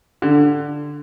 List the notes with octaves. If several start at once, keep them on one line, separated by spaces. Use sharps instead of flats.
D3